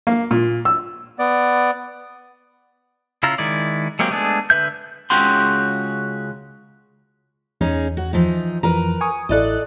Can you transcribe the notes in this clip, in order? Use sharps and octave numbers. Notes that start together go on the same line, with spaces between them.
A#3
A#2
E6
B3 D5
C#3 E4 F4 A#5
D#3 G#3 E4 D5
F#3 G#3 A#3 C4 G4
G#3 A3 B3 D4 G#4
D3 B4 E5 G6
C#2 C#3 F#4 G5 C6
E2 C#4 D#4 G#4
F#4
E3 F3 D#4
F2 E3 F3 A#4 B4 A#5
G#5 C#6 D#6
A1 E4 A4 D5 D#5 F#6